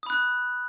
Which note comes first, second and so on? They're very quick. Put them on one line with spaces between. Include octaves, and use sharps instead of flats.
D#6 B5 F#6